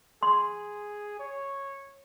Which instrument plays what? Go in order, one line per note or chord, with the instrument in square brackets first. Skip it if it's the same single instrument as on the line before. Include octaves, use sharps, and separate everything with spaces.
[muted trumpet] G#4 [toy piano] C6
[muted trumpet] C#5